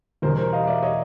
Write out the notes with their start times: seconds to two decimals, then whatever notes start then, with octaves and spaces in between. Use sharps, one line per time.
0.22 E2 B2 G3 A#4 C5
0.37 A#4 C5
0.53 D#5 F5
0.67 D5 E5
0.82 C#5 D#5